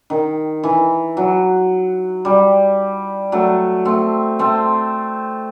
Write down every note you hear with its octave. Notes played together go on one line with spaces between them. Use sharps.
D#3
E3
F#3
G3
F#3 A3
A3 C4
A3 C4